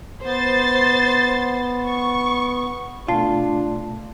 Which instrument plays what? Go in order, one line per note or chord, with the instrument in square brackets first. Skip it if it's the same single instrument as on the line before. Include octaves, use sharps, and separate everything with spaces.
[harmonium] B3 [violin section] C5 C6 A6
[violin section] C#6
[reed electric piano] B2 A3 [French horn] D4 [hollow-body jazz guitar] F4 [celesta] D5 A5 C7